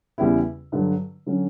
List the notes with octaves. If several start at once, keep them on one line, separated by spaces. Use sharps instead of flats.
E2 C#3 G3 B3 E4
G2 D3 F#3
D3 F#3 C#4